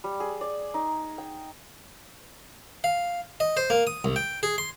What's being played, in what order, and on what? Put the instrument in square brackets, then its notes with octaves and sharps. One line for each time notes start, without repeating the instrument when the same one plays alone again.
[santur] G3
G#4
D5
D#4
G5
[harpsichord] F5
D#5
C5
A#3
D#6
C2
G5
G#4
C6